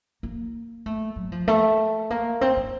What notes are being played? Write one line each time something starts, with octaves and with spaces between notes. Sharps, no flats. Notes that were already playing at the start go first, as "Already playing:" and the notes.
A#3
A3
F#3
F3
A3
A#3
C4
C4